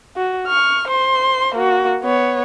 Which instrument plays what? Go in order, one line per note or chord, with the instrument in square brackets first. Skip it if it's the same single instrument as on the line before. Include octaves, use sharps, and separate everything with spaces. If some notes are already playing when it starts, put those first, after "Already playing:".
[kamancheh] F#4
C#6 F6
C5 C6
A#3 F#4
B3 C#5